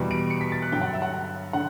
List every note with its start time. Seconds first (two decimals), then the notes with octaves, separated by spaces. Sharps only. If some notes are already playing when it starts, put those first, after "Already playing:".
Already playing: E2 B2 G3
0.11 D7
0.30 C#7
0.41 B6
0.52 A6
0.62 F#6
0.72 G2 D3 F#3 G5
0.82 F#5
0.93 E5
1.02 F#5
1.53 D3 F#5